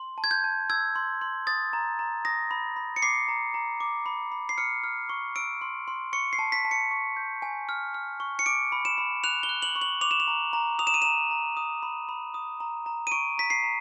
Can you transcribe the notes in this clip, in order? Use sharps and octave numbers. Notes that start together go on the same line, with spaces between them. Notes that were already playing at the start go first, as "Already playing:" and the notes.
Already playing: C6
A5
G#6
G6
A5
E6 G#6
C6
C6
D#6 A6
A#5
A#5
D#6 A#6
B5
B5
C#7
D6 C7
A#5
A#5
D6
B5
B5
C7
F6 C#7
F6
C#6
E6 D7
C6
C6
C#6 C#7
C7
A5
B6
A5
C#7
C#6
G6
G#5
F6
F6
C#6
C#7
D6 D7
B5
E7
B5
F#6 F7
G7
F#6
F#7
C#6
F#7
D6 F7
E7
F7
A#5
A#5
D#6 F7
E7
D#7
A#5 E7
A#5
D#6
B5
B5
D#6
A#5
A#5
D#7
C#6 D7
A#5 B6
C7
A#5